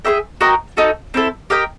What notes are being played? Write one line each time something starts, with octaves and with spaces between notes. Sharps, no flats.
G#4 C5 E5 G5
F#4 A#4 D#5 G5
D#4 F#4 A4
C4 E4 A4
G4 A#4 D#5 G5